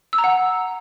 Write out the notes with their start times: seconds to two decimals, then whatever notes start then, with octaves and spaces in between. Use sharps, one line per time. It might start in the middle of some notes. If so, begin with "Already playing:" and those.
0.13 E6
0.18 A#5
0.24 F#5